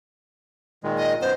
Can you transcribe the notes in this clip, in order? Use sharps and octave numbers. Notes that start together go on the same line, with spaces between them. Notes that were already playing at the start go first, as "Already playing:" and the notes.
A#2 D#3 G#3
D#5
F#2 B3 C5